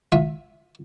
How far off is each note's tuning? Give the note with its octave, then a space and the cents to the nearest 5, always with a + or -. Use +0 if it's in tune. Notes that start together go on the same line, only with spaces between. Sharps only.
F4 +35 E5 +0